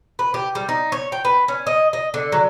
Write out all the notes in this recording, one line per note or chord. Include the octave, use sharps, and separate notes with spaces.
B4
G4
G3
D#4
C#5
G5
B4
C#4
D#5
D#5
D3
F#3